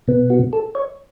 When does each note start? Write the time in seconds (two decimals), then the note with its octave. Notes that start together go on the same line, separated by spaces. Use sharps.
0.08 B2 B3
0.30 F#4
0.53 A4
0.75 C#5